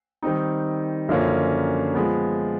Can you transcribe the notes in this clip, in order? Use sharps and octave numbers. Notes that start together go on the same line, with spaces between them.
D#3 G3 C4 D#4
F#2 D3 F3 A#3 C#4
F3 G#3 B3